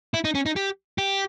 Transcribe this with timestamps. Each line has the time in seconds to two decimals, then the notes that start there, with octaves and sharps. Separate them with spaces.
0.14 E4
0.25 D#4
0.35 C#4
0.46 D#4
0.56 G4
0.98 G4